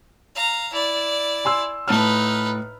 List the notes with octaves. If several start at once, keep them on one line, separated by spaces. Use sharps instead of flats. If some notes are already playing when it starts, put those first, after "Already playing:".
F5 A#5
E4 D5
G#5 C6 E6
A2 D#4 B4 A5 F6